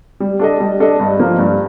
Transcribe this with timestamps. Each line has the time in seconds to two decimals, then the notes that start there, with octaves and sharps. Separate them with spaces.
0.20 G3
0.39 D4 A4 D#5
0.60 G3
0.80 D4 A4 D#5
1.00 G2
1.19 F3 A#3
1.39 G2